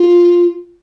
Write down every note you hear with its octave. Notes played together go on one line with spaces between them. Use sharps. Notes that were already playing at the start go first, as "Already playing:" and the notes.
Already playing: F4